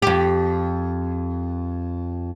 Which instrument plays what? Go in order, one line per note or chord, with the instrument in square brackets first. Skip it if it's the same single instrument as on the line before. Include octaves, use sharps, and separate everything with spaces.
[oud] F2 G4